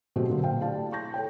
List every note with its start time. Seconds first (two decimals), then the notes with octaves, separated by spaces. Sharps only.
0.16 B2 F#3 A3 C4 F#4 G4
0.29 A#2 D3 F#3 A#3
0.44 F5 G5
0.60 A3 E4 G4 D5 F5 A5
0.92 C#6 G6 A#6
1.14 A4 C#5 G5